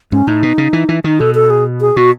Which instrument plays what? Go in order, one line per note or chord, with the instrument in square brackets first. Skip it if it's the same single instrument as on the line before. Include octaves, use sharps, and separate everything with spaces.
[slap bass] G#2 [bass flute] C#4
[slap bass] A2 [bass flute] D#4
[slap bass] B2
C#3
E3
E3
[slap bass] D#3 [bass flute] D#4
[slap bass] B2 [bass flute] A4
[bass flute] A4
G#4
G#4
[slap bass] B2 [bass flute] F#4